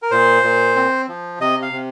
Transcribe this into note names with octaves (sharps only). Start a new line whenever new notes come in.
A#4
A#2 C5
A#2
C4
F3
C3 D#5
F5
C3